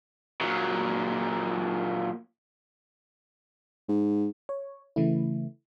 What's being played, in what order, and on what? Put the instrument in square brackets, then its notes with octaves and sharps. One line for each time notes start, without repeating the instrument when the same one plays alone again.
[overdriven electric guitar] A#2 F#3
[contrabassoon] G#2
[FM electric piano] C#5
C#3 E3 A3 E4